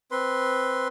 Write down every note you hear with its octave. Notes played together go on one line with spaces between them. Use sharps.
C4 B4 C6